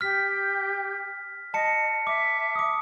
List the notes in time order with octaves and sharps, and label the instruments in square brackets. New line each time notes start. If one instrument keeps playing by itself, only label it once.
[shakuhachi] G4 [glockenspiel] F6 B6
[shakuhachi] D#5 [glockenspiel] A5 C#7
[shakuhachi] E5 [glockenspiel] D6
[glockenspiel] D6 D#6